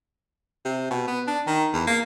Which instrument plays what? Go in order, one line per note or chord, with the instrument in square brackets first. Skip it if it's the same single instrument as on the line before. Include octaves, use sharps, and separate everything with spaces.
[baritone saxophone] C3
B2
B3
D4
D#3
E2
A#3